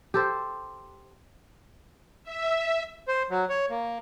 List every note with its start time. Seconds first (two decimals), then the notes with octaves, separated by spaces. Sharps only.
0.14 G4 A4 C5
2.24 E5
3.08 C5
3.30 F#3
3.49 C#5
3.70 A#3